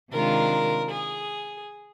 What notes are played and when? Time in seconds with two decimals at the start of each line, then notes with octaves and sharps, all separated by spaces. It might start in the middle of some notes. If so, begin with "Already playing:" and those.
0.12 C3 D#3 G#3 D4 F4 A#4
0.91 G#4